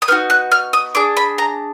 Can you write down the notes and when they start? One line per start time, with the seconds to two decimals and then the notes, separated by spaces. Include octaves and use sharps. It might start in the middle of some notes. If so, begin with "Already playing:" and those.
0.02 D#6
0.08 B3 D#4 F#4 F6
0.30 F#6
0.52 F6
0.73 D#6
0.95 D4 G#4 D6
1.17 B5
1.38 A#5